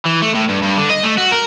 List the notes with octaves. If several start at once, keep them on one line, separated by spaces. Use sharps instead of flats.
E3
A3
A2
G2
G2
D3
D#5
A3
F#4
A#4